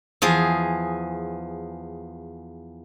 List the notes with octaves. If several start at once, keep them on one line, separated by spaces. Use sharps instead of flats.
E2 F3 G#4